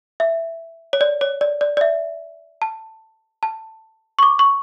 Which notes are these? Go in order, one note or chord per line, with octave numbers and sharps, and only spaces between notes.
E5
C#5
D5
C#5
D5
D5
D5
E5
A5
A5
C#6
D6
C#6